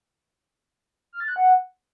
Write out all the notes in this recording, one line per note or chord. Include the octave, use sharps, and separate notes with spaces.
F6
A6
F#6
F#5